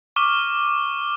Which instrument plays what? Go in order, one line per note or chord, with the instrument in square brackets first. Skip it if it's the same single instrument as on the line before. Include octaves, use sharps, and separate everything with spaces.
[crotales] C#6 D6 F6 G7